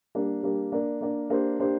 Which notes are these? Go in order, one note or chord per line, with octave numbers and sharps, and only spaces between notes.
G3 A#3 D4 G4
G3 A#3 D4 G4
A#3 D4 A#4 D5
A#3 D4 A#4 D5
A#3 D4 G4 C5
A#3 D4 G4 C5